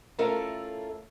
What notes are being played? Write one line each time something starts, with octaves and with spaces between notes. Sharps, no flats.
A3 C#4 E4 F4 A4 A#4